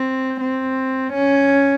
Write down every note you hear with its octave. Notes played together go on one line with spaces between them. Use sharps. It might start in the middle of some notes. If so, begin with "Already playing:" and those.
Already playing: C4
C4
C#4